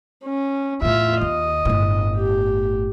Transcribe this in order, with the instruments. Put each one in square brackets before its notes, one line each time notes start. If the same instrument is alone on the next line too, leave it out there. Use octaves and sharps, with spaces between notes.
[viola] C#4
[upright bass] E2 A2 [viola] F4 E5
[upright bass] D#2 [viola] D#5
[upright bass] G1 A2
[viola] G4